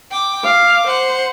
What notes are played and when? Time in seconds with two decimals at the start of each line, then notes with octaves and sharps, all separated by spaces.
0.11 G5 D6
0.43 F5 D6
0.87 C5 F#5